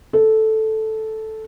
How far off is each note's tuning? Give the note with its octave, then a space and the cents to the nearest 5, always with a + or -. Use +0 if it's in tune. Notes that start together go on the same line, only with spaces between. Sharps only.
A4 -5